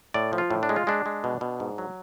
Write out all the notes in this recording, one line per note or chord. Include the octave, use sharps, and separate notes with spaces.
A2 D5
F3
F4
A2
D4
G#3
F4
G#3 D4
G#3
B2
B2
G#2
F#3